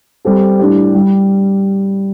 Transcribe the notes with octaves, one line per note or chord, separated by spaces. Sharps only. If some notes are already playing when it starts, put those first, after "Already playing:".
G3 C4 A4
A2 G3 D4 G4
G3